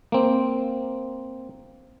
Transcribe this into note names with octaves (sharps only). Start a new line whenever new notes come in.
A#3 C4